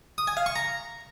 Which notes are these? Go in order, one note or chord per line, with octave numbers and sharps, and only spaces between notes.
D#6
G#5
F5
C#6
A#5